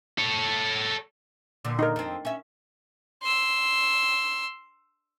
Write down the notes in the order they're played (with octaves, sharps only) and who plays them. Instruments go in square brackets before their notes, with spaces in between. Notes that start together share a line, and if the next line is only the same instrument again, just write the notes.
[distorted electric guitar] A4 C#5
[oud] A#2 D3
[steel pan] D#4 A#4
[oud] F2 C4
C#4 E5
[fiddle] C6 E6